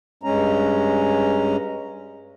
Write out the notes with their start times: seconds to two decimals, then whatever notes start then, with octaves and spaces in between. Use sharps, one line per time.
0.23 G2 G#3 C#4 A#5